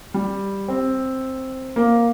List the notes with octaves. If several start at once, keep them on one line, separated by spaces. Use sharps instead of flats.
G3
C4
A#3